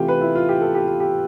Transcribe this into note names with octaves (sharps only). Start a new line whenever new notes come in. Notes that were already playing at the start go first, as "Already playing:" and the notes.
Already playing: C3 E3 A3 F4 G4
B4
E4
F4
G4
A4
G4
F4
G4